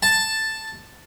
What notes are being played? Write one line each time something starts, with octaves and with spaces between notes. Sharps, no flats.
A5